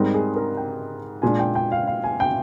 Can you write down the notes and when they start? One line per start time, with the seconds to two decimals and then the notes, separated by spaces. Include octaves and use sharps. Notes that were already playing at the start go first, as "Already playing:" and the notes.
Already playing: G#2 G3 C4 D#4 A#4
0.14 G#4
0.36 A#4
0.57 G5
1.22 A#2 G#3 D4 G#5
1.39 G5
1.55 G5
1.72 F5
1.87 F5
2.04 G#5
2.20 G5